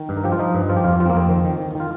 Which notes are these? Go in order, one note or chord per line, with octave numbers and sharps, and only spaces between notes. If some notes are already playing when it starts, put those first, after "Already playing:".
Already playing: D#3
G2
A#4
F3 G4
F4
F3 D#4
G2
F3 F4
G4
F2 F4
F3 F4
C4
A#3
F2
C4
D#3
D#3
D#3
D#3 F4